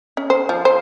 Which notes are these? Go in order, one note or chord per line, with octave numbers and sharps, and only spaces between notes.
C#4
C5
F3
C5